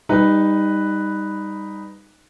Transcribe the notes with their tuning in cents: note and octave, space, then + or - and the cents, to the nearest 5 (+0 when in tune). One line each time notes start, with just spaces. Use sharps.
G3 +20 D#4 +0 B4 +0